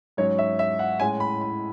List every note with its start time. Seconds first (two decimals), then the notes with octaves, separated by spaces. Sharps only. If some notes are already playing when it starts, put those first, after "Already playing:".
0.17 G#2 F#3 C#4 C#5
0.38 E5
0.59 E5
0.79 F#5
1.00 A2 G#3 C#4 G#5
1.20 B5
1.41 B5